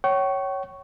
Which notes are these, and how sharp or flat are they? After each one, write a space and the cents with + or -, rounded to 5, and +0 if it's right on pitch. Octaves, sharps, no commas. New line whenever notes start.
C#5 +0 G5 -45 C#6 +0